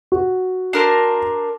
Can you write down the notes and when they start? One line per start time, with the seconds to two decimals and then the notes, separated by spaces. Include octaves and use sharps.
0.12 F#4
0.73 D4 A#4 C5